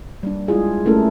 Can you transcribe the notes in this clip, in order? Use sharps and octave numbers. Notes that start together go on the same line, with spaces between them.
G3 A#3 D4
G#3 E4 F4 G#4
A3 A#3 C#4 E4 A4 A#4